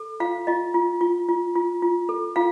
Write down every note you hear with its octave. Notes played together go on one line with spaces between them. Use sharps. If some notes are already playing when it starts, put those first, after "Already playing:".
Already playing: A4
F4 F5
F4 D#5
F4
F4
F4
F4
F4
A4
F4 F5